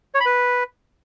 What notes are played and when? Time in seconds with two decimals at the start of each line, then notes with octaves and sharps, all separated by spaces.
0.15 C#5
0.20 B5
0.26 B4